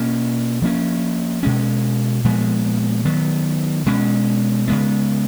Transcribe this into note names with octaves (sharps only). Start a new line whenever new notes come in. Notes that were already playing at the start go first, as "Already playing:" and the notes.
Already playing: B2 A#3 C#4
F3 A#3 C#4
B2 G#3 C#4
A#2 F3 G#3 B3
D#3 F#3 B3
B2 G#3 C#4
C#3 G#3 B3